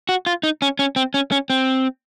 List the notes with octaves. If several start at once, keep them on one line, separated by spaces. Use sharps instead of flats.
F#4
F4
D#4
C#4
C#4
C4
C#4
C#4
C4